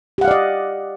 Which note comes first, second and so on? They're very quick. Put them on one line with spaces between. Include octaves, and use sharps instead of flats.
G4 F#5 F5 D5 D#5